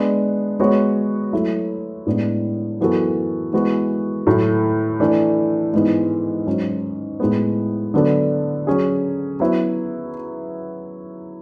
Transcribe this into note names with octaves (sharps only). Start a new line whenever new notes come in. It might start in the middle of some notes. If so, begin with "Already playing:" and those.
Already playing: G#3 B3 D4
G#3 B3 F#4 C#5
F#3 A3 E4
A2 G#3 B3 D4
F#2 E3 B3 F#4 A4
E3 G#3 B3 F#4 B4
A2 F#3 A3
E3 A3 D4 A4
G#2 E3 G#3 B3
G#2 F#3 C#4
A2 G#3 B3
D3 F#3 B3 D4 A4
F#3 C#4 G#4
F#3 B3 E4 B4